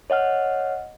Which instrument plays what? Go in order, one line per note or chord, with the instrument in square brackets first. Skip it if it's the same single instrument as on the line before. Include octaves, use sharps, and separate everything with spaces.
[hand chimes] C#5 D#5 F#5 F6